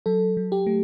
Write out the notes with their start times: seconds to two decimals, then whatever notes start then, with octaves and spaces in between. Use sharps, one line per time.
0.06 F#3 A4
0.37 F#3
0.52 G4
0.67 A3